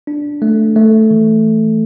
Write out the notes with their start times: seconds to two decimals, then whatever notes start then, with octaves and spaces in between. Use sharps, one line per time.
0.07 D4
0.42 A3
0.76 A3
1.10 E3